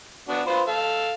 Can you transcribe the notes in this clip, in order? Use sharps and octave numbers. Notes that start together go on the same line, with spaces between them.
B3 D4 F#4
F4 B4 C5
A4 F5